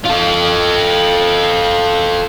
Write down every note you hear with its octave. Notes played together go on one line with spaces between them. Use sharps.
F4 A4